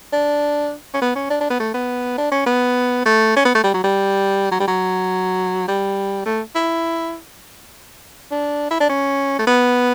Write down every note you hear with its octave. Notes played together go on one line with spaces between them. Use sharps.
D4
C#4
B3
C#4
D4
D4
B3
A3
B3
D4
C#4
B3
A3
C#4
B3
A3
G3
F#3
G3
F#3
G3
F#3
G3
A3
E4
D4
E4
D4
C#4
A3
B3